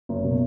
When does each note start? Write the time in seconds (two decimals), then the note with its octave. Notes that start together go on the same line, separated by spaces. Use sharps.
0.09 F#1
0.24 B2